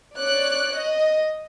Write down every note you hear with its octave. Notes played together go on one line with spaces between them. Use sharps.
C#5 D5 F#6
D#5